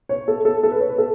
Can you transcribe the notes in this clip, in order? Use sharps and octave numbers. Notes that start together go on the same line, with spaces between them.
C#5
A4
A4
A4
B4
C#5
B4
A4